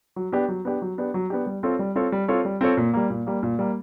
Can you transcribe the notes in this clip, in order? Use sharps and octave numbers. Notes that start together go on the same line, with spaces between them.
F#3
B3 D4 G4
F#3
B3 D4 G4
F#3
B3 D4 G4
F#3
B3 D4 G4
G3
C4 F4 A4 C#5
G3
C4 F4 A4 C#5
G3
C4 F4 A4 C#5
G3
C4 F4 A4 C#5
A#2
G3 A#3
A#2
G3 A#3
A#2
G3 A#3